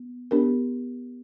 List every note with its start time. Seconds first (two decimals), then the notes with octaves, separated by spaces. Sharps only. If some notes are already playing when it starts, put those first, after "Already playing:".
Already playing: B3
0.31 B3 D4 G4 A#4